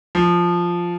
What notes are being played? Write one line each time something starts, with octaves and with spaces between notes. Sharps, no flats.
F3